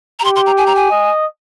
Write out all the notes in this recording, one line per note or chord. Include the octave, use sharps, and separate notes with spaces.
A#5
G4 C6
C6
A#5
G#5
A#5
G#5
D#5